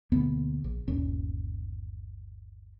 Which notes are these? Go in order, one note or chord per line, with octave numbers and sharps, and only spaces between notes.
D2 B2 A#3 B3
A#1
G1 D#2 A#2 C#4